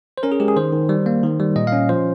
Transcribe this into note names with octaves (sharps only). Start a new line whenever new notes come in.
C5
C#4 A#4
G#4
G#3 G4
G#4
D#3 C5
D#3
G3
A#3
D#3
G3
A#2 D#5
C#4 F5
F3 C5